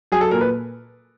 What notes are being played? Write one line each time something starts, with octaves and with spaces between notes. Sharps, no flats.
F#3 G#4
A4
A#2 A#4
B4